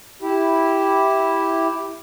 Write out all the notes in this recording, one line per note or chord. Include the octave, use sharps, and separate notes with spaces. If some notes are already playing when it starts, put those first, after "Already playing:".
E4 G4